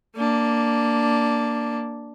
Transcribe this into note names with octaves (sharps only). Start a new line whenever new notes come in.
A#3 D4